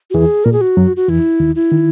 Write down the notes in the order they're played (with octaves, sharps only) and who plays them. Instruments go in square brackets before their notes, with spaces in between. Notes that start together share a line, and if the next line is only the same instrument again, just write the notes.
[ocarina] F#4
[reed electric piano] E2 E3 [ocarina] G#4
[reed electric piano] A#2 [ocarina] A#4
[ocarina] G#4
F#4
[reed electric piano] F#2 F#3
[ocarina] F#4
[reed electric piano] E2 E3 [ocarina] E4
[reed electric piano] D#2 D#3
[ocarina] E4
[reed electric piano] D#3